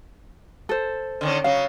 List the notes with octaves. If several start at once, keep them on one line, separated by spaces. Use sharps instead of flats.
A4 C5
D3 D#3 C#4
C#3 F#3 F5